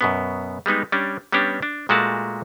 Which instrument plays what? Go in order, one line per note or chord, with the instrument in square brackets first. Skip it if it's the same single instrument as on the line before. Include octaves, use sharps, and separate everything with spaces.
[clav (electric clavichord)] F#2 B2 B3
G3 G#3 B3 D#4
G3 C#4 D4
G3 B3 C#4 D4 G4
D4
A#2 G#3 A3 F#4 A#4 A5